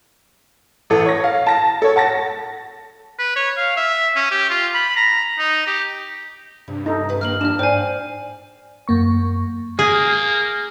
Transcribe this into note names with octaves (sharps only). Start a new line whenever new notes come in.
A1 A4
C#5 A#6
F5
A5 A#6
A4 C#5
F#5 A5 A6 A#6
B4
C#5
F5
E5
C#4
G4
F4
B5
A#5
D#4
G4
G2 C3
D#4 A4
G#2 B4
D#3 A#3 F6 F#7
F3 D4 F6 E7
G#2 C5 D5 F5 G5 G#5
F#2 A#3 C#6
A#3 G#4